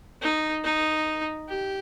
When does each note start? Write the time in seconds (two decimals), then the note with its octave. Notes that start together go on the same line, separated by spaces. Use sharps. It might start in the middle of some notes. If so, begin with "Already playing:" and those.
0.22 D#4
0.64 D#4
1.49 G4